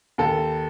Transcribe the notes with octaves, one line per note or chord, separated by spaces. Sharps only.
D#2 A4